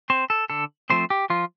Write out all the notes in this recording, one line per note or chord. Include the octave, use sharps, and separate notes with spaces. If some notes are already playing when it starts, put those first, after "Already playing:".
C4 C5
A4
D3 A4
F3 A3 C4 C5
G4
F3 F4